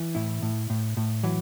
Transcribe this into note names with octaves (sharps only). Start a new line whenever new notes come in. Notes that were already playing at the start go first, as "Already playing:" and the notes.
Already playing: E3
A2 E4
A2
A2
A2
E3 F#3